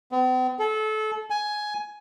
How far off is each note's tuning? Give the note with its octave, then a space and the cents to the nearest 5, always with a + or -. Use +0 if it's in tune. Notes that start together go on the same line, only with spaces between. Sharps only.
C4 -45
A4 -25
G#5 +10